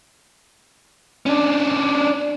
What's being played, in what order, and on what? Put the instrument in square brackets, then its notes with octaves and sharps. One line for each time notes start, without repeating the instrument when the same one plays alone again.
[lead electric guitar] C#4 D4